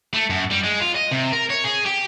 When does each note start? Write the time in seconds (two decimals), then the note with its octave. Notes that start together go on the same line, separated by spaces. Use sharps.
0.14 A3
0.30 F#2
0.51 G3
0.64 G#3
0.81 F4
0.95 D#5
1.11 C3
1.32 A#4
1.50 C#5
1.64 G#4
1.85 G4